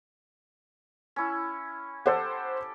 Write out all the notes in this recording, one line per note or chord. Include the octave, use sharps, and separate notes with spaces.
C#4 E4
G4 A4 C5 F#5